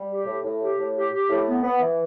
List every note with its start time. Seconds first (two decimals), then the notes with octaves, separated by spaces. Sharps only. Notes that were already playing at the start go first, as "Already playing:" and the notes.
Already playing: G3
0.10 G4
0.26 A2
0.44 A2
0.60 G4
0.78 A2
0.96 G4
1.12 G4
1.30 A2
1.47 B3
1.64 B3
1.81 E3